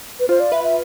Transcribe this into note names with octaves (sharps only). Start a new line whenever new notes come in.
B4
F4 C5
D5
B4 E5
E5